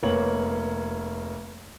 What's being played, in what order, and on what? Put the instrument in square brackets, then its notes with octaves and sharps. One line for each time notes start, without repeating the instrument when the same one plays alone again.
[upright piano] F1 A#3 B3 C#5 F#7